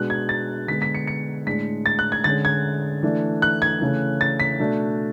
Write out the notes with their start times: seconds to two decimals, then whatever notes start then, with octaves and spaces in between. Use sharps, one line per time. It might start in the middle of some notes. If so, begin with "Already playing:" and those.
Already playing: B2 G#3 B3 D4 F#6
0.10 G#6
0.29 A6
0.68 D3 G#3 B3 B6
0.82 B6
0.95 C#7
1.07 C#7
1.47 A2 G#3 D4 B6
1.86 A6
1.99 F#6
2.12 G#6
2.24 D3 G#3 C#4 A6
2.45 G#6
3.03 E3 A3 D4
3.42 F#6
3.62 G#6
3.81 C#3 E3 A3 C#4
4.21 A6
4.40 B6
4.59 B2 A3 D4